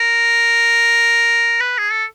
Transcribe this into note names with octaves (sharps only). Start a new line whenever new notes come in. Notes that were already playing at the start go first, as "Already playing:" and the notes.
Already playing: A#4
B4
G#4
A4